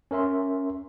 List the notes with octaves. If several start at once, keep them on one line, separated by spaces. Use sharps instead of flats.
C#4 A#4 E5 C6